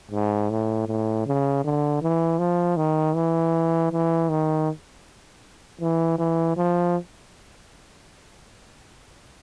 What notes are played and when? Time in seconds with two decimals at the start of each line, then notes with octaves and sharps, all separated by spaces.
0.11 G#2
0.51 A2
0.87 A2
1.26 C#3
1.64 D3
2.02 E3
2.39 F3
2.77 D#3
3.16 E3
3.92 E3
4.30 D#3
5.81 E3
6.18 E3
6.57 F3